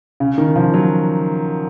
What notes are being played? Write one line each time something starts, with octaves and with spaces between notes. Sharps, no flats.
C#3
D#3
F3
F#3